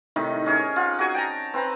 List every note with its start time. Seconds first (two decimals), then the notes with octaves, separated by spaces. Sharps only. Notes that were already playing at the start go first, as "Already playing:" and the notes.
0.16 A2 C3 D#3 D#4
0.46 C#4 G#4 A#4 C#5
0.76 F4 F#5
0.99 F#4 G#4 G#5 C#6
1.14 G5 A5 A#5
1.54 C4 B4 C5 A#5